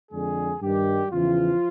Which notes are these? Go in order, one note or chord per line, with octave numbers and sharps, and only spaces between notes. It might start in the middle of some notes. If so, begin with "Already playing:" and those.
F2 D3 G#3 G#4
G2 D#3 G3 G4
E2 C#3 E3 F3 F4